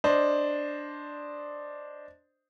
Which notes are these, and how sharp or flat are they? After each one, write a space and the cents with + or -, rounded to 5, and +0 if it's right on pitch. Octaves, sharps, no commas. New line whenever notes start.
D4 +0 C5 +0 D#5 +0